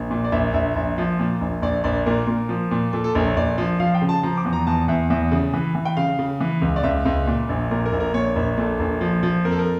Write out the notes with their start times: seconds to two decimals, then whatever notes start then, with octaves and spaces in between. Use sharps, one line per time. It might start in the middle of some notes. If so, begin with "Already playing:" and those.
Already playing: A#1
0.11 A#2
0.24 D5
0.32 A#1 E5
0.53 A#1 E5
0.76 A#1
0.98 F3
1.19 A#2
1.41 A#1
1.62 A#1 D5
1.84 A#1 D5
2.06 A#2 A#4
2.27 A#2
2.49 F3
2.71 A#2
2.93 A#2 A4
3.04 A4
3.15 A#1 A#4
3.26 C#5
3.37 A#1 D5
3.58 F3
3.80 F3 F5
3.95 G5
4.02 C#3
4.09 A5
4.23 F3 A#5
4.37 D6
4.45 E2
4.53 A#5
4.67 E2 A5
4.88 E2 E5
5.10 E2 E5
5.32 C#3
5.54 E3
5.75 E3
5.85 G5
5.97 C#3 F5
6.19 C#3
6.40 E3
6.62 C#2
6.76 D5
6.83 C#2 E5
7.05 C#2
7.27 A#2
7.49 A#1
7.71 A#2 A#4
7.86 A#4
7.93 A#1
8.00 A#4
8.14 A#2 C#5
8.36 A#1
8.57 A#2 A4
8.80 A#1
9.01 F3
9.23 F3
9.44 F2 A#4
9.52 A4
9.59 A#4